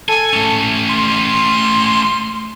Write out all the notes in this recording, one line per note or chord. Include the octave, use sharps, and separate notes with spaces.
A4 G#5
A3 C#4
C6